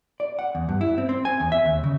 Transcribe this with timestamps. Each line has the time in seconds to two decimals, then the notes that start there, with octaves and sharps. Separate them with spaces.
0.20 D5
0.39 F#5
0.55 E2
0.69 G2
0.81 E4
0.98 C4
1.09 C4
1.25 G#5
1.40 E2
1.52 E5
1.66 D#2
1.84 C#3